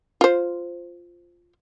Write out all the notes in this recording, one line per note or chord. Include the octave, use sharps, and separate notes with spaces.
F4 C5